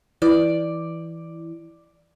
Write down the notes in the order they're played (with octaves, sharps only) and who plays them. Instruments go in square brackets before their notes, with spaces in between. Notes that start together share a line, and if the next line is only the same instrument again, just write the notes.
[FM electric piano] E3 [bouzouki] D5